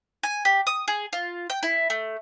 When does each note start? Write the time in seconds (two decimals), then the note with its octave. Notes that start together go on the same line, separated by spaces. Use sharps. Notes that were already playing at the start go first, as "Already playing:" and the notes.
0.23 G#5
0.45 G4
0.67 D#6
0.88 G#4
1.13 F4
1.50 G5
1.63 E4
1.90 A3